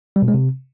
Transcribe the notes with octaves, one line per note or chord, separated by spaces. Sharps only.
G3
B2
G#3
C3